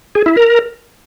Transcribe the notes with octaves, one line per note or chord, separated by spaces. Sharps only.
G#4
E4
A#4